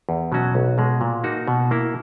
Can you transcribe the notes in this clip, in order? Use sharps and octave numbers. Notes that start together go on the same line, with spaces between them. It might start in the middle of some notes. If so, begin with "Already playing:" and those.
E2
B2 F#3 C#4 F#4
B1
B2 G#3
A#2
A#3 D#4 F#4
B2
A#3 E4